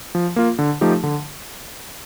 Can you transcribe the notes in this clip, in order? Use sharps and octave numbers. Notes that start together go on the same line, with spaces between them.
F3
A#3 F4
D3
F3 A3 D#4 G4
D3